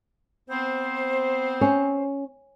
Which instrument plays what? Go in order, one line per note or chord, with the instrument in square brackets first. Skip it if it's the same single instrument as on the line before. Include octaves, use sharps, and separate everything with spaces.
[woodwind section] B3 C4 C5
[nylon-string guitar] C#4